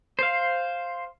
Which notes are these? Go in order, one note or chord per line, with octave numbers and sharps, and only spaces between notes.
C5 F5